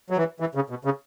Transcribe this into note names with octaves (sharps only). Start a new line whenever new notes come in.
F#3
E3
E3
C#3
B2
C#3